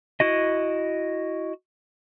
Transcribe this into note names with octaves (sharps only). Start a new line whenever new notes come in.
E4 F#4 D#5